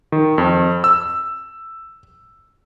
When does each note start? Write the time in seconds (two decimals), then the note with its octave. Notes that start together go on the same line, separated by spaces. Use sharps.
0.12 D#3
0.38 F2
0.84 E6